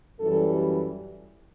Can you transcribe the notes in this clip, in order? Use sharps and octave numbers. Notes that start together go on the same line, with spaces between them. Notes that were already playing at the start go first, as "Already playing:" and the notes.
F#2 E3 G3 A4